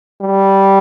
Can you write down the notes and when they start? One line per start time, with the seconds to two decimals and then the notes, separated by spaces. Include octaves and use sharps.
0.21 G3